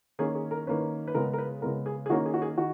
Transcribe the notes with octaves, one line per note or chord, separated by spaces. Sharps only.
D#3 A#3 C#4 G#4
G#4
A#4
D#3 A#3 C#4 B4
B4
C#3 G#3 B3 A#4
A#4
B4
C#3 G#3 B3 A#4
G#4
G#4
D#3 A#3 C#4 F#4
G#4
F#4
G#4
D#3 F#4